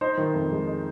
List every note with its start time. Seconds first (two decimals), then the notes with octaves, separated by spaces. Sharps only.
0.01 D#4 C5
0.17 D#3
0.34 F2
0.51 G#3
0.67 D#4